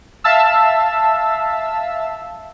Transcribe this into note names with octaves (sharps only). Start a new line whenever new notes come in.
E5 F5 A5 E6